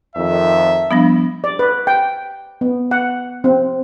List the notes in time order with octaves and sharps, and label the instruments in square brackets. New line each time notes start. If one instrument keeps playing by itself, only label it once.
[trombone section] F2 D#3 [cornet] E5
[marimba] F3 B3 [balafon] G3 D4
[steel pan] D5
B4
G5
B3
F#5
C4